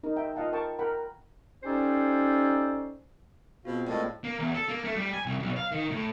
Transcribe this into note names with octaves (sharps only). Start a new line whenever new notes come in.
D#4 A#4
E5 G5
F4 D#5 F5 F#5 A5
A#4 F5 G5 A5 C#6
A#4 F#5 G5 B5
C#4 D#4 G4 A4 C5 D5
B2 C4 F4 F#4 G#4 C5 F5
A2 G#3 A#3 G4 D5 D#5 A5
A#3
E2
A4
A#3
A3
G3
G#5
C2
B1
F5
D#3
A2